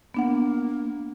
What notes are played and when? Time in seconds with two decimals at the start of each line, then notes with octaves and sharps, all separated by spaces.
0.14 A#3 B3 D4 F#5